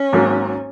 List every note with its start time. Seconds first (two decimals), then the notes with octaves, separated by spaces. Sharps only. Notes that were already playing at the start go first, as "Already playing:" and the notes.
Already playing: C#4
0.13 G#1 G#2 F#3 A#3